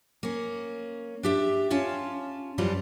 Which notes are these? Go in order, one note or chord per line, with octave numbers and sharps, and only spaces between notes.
A#3 C#4
D4 G4 E5
C#4 F4 A5
F#2 E3 F3 G3 F4